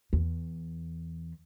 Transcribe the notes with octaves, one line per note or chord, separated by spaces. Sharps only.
E2